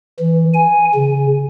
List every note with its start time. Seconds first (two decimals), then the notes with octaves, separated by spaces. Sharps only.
0.19 E3
0.53 G#5
0.95 C#3